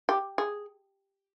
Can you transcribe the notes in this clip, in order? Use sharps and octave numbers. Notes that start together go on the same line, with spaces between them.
G4
G#4